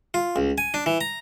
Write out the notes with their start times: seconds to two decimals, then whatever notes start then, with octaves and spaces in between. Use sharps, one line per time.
0.14 F4
0.36 C#2
0.58 G#5
0.74 D4
0.86 E3
1.01 A#5